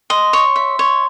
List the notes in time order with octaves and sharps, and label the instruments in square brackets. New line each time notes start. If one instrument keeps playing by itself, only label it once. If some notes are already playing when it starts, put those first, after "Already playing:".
[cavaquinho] D#5 [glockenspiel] C6
[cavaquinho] C#5
E5
[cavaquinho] C#5 [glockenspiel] C6